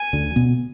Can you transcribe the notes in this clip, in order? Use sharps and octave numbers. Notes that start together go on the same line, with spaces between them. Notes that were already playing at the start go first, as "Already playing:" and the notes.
Already playing: G#5
D2 D3
B2 B3